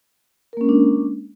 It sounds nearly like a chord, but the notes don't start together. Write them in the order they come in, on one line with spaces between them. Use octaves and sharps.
A#4 A#3 C#4 G#3 D4